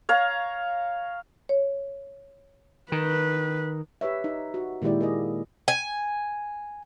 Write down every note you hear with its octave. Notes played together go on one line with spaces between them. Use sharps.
C#5 F5 A#5
C#5
D#3 B4
G4 B4 C#5 E5
D#4
F#4
A#2 D#3 G#3 E4 G4 D5
A#3 G#4 D#5
G#5